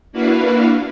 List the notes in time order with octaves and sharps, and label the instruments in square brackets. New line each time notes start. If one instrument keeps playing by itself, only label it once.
[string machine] A#3 D4 E4 F#4 B4 F5